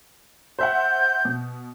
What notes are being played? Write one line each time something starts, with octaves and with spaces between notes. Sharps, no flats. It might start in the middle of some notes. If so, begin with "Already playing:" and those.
C5 E5 F#5 G6
B2